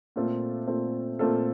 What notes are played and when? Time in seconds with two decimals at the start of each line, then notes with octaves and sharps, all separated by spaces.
0.16 A#2 A3 C4 F4 A4
0.67 A#2 A3 C4 F4 A4
1.19 A#2 A3 C4 F4 A4